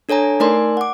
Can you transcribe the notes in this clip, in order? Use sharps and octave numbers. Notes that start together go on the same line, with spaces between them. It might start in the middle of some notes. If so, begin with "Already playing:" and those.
D4 A4 C#5 G#5 A#5
A3 D#4 A#4 D5 G#5 C6
F#5 D6